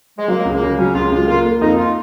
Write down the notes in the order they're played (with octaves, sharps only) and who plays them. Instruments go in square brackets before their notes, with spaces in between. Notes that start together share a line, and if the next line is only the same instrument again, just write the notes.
[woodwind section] G#3
[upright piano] F#3 [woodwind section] A#3
[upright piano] C#2
[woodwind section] A#3
[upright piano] C#3
[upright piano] F#3 [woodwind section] C#4
[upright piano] C#2 [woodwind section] F4
[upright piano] C#2 [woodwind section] F4
[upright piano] A#3 [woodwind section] F4
[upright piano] A#3
[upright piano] F2 [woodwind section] D#4
[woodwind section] F4